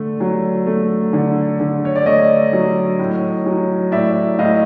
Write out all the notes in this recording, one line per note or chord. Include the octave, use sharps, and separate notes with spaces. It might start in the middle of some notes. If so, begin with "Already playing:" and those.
Already playing: D3 A3
F#3
A3
D3
D3
C#5
D5
A3 C#5 D#5
F#3
A2
F#3
A2 D5 E5
A2 D#5 F5